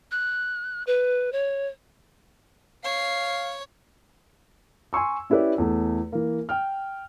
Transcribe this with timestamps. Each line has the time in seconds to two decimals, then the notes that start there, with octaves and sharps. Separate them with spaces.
0.11 F#6
0.87 B4
1.32 C#5
2.84 C#5 F5 C7
4.93 G#5 C6 C#6 E6
5.30 C#4 E4 G4 B4 D5
5.58 E2 A3
6.12 E3 A#3
6.49 G5 F6